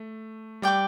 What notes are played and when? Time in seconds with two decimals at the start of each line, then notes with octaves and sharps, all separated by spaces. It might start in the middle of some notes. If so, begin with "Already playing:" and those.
Already playing: A3
0.62 G3 D5 G5 D6